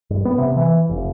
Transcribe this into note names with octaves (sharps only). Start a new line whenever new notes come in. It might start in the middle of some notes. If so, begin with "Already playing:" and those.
G2
B3
C3
E3
F1